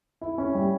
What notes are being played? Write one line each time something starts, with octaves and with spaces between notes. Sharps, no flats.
E4
C#4
G3